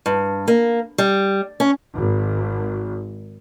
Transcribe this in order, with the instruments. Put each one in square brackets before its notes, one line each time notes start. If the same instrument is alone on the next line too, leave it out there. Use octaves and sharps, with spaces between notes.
[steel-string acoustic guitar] G2
A#3
G3
C#4
[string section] G#1